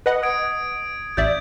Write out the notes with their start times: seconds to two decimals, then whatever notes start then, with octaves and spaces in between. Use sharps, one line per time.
0.06 B4 D#5 F#5
0.23 D#6 G#6 D7
1.17 A1 D5 E5 G6